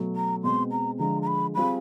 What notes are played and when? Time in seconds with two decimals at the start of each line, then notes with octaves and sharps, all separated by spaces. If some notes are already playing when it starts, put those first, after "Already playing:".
Already playing: B2 F#3 A3
0.16 A#5
0.44 B2 G#3 C4 C6
0.71 A#5
0.99 D3 F3 G#3 A#5
1.22 A#5
1.27 B5
1.55 G3 C4 F4 G#4 B5